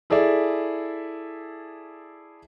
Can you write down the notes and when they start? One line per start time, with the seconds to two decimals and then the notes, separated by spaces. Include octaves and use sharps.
0.10 E4 G#4 A4 D5 E5